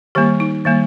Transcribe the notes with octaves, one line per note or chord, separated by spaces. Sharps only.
D#3 G3 A#3 G4
D#4
D#3 G3 A#3